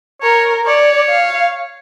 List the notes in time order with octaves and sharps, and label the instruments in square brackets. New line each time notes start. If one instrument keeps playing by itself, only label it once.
[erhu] A#4 [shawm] C#5
[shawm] C#5 [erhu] D5
[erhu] F5